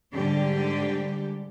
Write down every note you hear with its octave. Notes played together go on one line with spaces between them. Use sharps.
G#2 D3 G3 G4